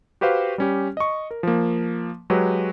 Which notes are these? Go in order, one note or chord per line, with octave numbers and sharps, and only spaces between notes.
F#4 G4 B4 C5 F5
G3 C#4 G4
D#5 C#6
A#4
F3 A#3
F#3 G#3 F#4 G4 B4